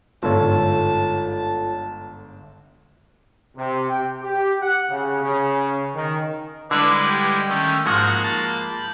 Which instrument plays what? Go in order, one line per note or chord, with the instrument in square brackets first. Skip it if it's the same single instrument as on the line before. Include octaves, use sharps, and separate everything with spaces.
[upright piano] G1 G#2 D3 [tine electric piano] F4 A4 C#5 [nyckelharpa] A5
[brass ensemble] C3
G5
G4
F#5
C#3
C#3
D#3
[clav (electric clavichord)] D3 [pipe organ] G3 G#3 E4 [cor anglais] D4 [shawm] B4
[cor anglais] G4 [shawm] G5
[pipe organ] D#3 C#4 [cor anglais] A3
[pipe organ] G#2 F#5 G6 [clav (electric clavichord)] F3 G#3 [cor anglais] A#3 [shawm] F#4
[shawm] A5 [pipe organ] B5 G6